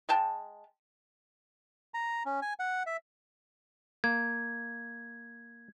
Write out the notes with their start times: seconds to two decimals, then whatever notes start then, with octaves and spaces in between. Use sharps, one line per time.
0.09 G#3 G5 A5
1.94 A#5
2.25 C#4
2.42 G#5
2.59 F#5
2.86 E5
4.04 A#3 G#6